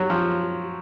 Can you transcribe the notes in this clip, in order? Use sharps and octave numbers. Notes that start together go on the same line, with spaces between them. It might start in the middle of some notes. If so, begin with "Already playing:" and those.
Already playing: F#3
F3